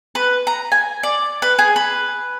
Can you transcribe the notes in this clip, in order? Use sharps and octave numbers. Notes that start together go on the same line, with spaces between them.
B4
A#5
G#5
D5
B4
G#4
B4